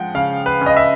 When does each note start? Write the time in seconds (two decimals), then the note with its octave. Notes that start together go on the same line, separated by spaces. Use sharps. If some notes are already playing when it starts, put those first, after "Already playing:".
Already playing: F3 G#3 F#5 G5
0.15 C#3 F5
0.46 B4
0.61 C#3
0.66 D#5
0.77 E5